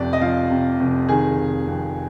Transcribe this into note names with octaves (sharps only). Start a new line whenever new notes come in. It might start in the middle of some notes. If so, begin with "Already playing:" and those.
Already playing: F1 F2 C3 D5
D#5
F3 F5
C3
F1
D#3 G#4
F1
F2